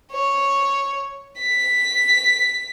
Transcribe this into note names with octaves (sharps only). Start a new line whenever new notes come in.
C#5
B6